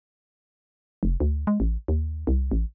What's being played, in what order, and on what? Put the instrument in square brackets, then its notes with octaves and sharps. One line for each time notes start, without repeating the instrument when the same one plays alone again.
[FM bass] F1
D2
G#3
A1
D#2
C2
A1